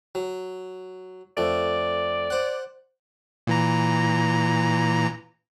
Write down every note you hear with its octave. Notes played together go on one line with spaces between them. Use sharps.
F#3
F2 A3 D5
C5 F#5
A#2 E3 A#5